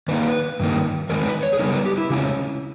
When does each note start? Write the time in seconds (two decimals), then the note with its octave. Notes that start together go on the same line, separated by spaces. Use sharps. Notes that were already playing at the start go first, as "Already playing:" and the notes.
0.08 D#3 A#3 D#4 B4
0.60 G2 D#3 A#3
1.09 E2 D#3 G#3 D#4 A#4
1.26 B4
1.43 C#5
1.53 G#4
1.59 C#3 G3 B3 D#4 A#4
1.72 B4
1.86 G4
1.98 E4
2.10 C#3 G#3 C#4 E4